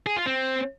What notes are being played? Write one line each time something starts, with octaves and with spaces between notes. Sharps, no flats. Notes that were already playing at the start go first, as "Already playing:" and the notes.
G#4
F4
C4